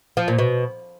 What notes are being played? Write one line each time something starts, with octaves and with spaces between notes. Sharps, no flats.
F3
A#2
B2